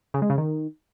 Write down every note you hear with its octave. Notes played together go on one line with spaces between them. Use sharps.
C#3
G#3
C#3
D#3